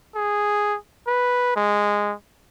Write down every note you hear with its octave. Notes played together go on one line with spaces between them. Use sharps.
G#4
B4
G#3